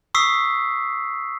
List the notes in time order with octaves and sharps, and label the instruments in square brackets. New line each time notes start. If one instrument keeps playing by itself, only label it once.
[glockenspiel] C#6 D#6 E6 B6 C7